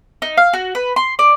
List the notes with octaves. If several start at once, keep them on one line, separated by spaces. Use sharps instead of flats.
D#4
F5
F#4
B4
C6
D5